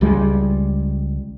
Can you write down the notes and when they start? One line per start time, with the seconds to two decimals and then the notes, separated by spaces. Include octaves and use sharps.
0.01 C#2 G3 G#3